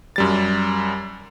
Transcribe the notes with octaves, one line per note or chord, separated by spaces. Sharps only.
F#2 G3 A6